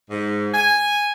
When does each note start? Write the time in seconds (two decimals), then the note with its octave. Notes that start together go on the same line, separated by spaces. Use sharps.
0.10 G#2
0.53 G#5